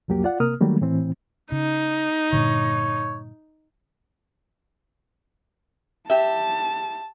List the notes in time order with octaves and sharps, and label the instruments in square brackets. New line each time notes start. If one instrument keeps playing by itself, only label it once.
[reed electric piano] C2 F2 F#3 A#3 G4
F4 D5 F#5
C3 A#3 A#4 D#6 F6
D#3 F#3 G3 A3 A#3
A2 E3 C4
[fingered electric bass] C#3 [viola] D#4
[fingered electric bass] G2 A#2 D3 [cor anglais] C#5
[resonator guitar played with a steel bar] G4 E5 [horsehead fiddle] A5